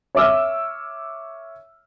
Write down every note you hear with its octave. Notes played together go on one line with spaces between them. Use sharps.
C#5 E5 D6 E6 F6